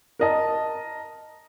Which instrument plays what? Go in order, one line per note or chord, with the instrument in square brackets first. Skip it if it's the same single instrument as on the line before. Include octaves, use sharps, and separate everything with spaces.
[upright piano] A#4 D#5 A5